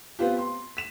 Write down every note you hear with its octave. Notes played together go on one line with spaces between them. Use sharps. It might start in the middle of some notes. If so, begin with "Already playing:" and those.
B3 C4 F4 G4
C6
B6 E7